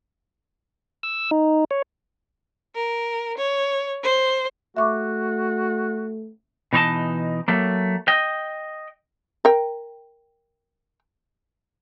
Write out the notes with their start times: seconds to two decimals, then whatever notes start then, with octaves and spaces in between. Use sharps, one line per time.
1.03 E6
1.31 D#4
1.71 C#5
2.76 A#4
3.37 C#5
4.02 C5
4.77 A3 F#4 E5 C#6 D6
6.73 B2 E3 D#4 C#5 D#5 A5
7.48 F#3 A3 A#3
8.08 D#5 G5
9.45 A#4 G5